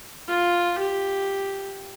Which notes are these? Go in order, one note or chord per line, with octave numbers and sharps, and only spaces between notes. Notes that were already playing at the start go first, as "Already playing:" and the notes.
F4
G4